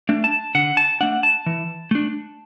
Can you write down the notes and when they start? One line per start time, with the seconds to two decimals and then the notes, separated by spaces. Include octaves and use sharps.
0.09 A3 D4
0.24 A5
0.55 D3 F#5
0.77 A5
1.01 A3 D4 F#5
1.23 A5
1.46 E3
1.91 A3 D4